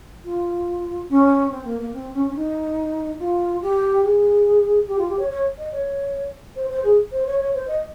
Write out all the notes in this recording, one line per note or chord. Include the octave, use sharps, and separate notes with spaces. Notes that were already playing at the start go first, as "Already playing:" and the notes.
F4
C#4
C4
A#3
A#3
C4
C#4
C#4
D#4
F4
G4
G#4
G4
F4
G4
C#5
C#5
D#5
C#5
C5
C5
G#4
C5
C#5
C#5
C5
D#5